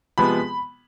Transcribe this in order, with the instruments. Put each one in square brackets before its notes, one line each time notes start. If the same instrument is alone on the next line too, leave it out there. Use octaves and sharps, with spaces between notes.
[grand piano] C3 F3 G#3 B3 B5